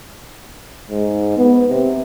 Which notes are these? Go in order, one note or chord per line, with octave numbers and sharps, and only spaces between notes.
G#2
B3
C3